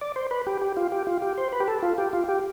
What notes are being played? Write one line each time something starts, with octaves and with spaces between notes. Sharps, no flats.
D5
C5
B4
G4
G4
F4
G4
F4
G4
C5
B4
G4
A4
F4
G4
F4
G4